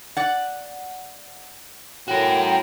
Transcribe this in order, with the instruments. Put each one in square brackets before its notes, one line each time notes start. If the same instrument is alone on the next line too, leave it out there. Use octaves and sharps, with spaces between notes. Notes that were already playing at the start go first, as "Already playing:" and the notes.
[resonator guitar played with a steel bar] D5 F#5
[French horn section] A2 [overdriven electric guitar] F#4 A#4 [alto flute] G5